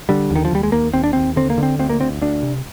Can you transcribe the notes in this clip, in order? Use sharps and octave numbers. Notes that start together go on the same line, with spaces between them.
D3 G3
D#2
D#3
F3
D#2 G3
G#3
D#2 A#3
D#2 C4
D4
D#2 C4
D3 C4
A#3
D3
C4
D2 C4
A#3
D2 C4
D2 D4
C3